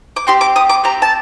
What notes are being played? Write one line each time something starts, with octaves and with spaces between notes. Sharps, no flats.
D6
C4 G4 C6
D6
D#6
D6
C4 G4 A#5
A5